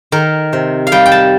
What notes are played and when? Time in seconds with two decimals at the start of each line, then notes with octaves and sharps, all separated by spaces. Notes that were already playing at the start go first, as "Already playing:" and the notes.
0.12 D#3 A#4
0.53 C3
0.87 F5
0.92 G3 G5
1.06 G5
1.12 A5